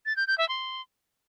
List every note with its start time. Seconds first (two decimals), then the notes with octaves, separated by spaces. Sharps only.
0.06 A6
0.16 G6
0.27 G6
0.38 E5
0.49 C6